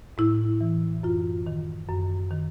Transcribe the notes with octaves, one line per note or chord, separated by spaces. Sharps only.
A2 E4
E3
F#2 F4
D#3
F#2
D#3